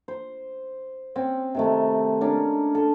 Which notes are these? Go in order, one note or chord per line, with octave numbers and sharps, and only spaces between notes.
C5
C4 C#4
C3 D#3 A3
C#4 D4 A#4
A4